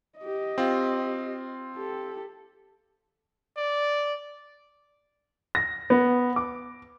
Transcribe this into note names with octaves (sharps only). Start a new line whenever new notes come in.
G4 D#5
C4 F4
G4 A4
D5
A#6
B3
D6